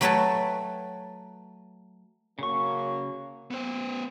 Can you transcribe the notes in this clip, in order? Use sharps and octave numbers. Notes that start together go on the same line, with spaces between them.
F#3 A3 B4 C#5 G5 A5
C#3 F#3 A#3 C#4 C#6
B3 C5